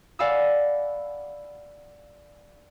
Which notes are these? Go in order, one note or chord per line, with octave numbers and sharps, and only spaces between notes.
D5 F5 F#5 G#5 B5 E6